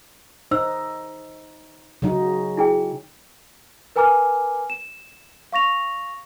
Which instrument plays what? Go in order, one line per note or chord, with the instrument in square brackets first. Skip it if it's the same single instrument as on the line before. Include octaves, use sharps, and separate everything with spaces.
[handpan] D#4 [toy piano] C5 E6
[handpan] C#3 F#3 D#4
[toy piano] E4 G#4 G5
[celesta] A#4 B4 G#5 A#5 D6 F6
E7
F5 C#6 A#6 F7